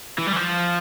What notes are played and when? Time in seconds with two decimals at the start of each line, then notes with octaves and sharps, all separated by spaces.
0.18 E3
0.27 G3
0.33 E3
0.36 F3